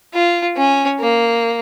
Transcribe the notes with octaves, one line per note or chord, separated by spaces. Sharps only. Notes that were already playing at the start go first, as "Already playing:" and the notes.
F4
C#4
A#3